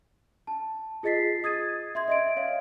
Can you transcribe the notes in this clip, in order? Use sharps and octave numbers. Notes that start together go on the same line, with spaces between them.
A5
F4 G#4 D#5 A6 B6 C7
D#6 G#6 A6 D#7
E5 C6 G#6
D#5 E5 D7
C#5 F5